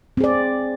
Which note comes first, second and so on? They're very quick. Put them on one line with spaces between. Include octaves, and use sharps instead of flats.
C4 G#4 D5